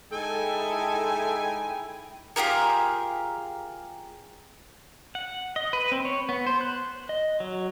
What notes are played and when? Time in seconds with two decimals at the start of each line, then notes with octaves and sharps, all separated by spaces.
0.12 G#3 D#4 E4 A4 G5 G#5
2.36 F4 G4 G#4 A#4
5.15 F#5
5.56 D#5
5.73 B4
5.92 C4
6.05 C#5
6.29 B3
6.47 C5
6.61 F#6
7.09 D#5
7.40 F#3